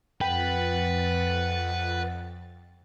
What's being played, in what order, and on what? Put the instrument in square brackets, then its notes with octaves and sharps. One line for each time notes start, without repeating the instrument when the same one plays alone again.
[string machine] F2 A6 [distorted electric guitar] B4 [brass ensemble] F#5 [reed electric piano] G5